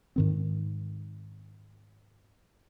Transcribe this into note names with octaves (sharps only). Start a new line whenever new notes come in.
G#2 D#3 C4